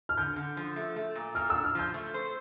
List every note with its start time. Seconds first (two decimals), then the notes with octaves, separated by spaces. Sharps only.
0.09 F6
0.17 D3 G6
0.36 D3
0.57 F3
0.76 A3
0.96 A3
1.15 A#2
1.35 A#2 F6
1.50 D4 E6
1.64 F6
1.75 F3 G6
1.94 A3
2.14 C5